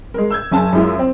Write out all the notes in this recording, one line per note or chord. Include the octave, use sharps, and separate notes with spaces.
G#3 A#4
E6 G6 G#6
F#1 C#4 G#5 A5
F#2 G#3 E4 F4
C4